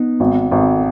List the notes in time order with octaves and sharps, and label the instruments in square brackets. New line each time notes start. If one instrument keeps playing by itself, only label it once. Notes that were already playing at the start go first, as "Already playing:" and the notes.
Already playing: [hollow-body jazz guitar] B3 D#4
[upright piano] G#1
G#1